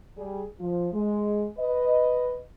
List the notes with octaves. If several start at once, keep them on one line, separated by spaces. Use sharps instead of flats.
G3 G#4
F3
G#3
B4 D#5